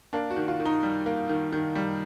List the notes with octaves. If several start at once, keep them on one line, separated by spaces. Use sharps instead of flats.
A#3 D4
F#4
D#3
F4
D#3
D#4
G3
A#3
D#3
D#3
G3